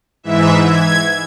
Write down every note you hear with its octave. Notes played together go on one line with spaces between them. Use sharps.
G#2 E3 E5
G#6